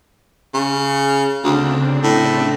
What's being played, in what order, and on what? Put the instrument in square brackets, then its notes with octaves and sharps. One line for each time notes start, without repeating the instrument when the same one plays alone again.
[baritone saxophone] C#3
[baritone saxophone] D2 [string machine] C#3 C4 D4
[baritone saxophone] A2